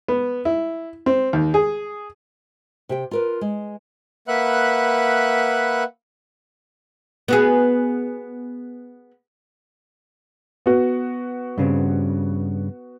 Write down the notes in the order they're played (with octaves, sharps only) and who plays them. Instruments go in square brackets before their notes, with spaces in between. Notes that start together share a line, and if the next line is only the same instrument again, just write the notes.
[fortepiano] B3
E4
C4
D#2
G#4
[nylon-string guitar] C3 G4 G5
F4 A#4 B4
G#3
[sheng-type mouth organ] A#3 B4 E5 F#5 B5 F#6
[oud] B3 F#4 G#4
[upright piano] B3 F#4
[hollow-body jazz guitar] G2 C#3 C4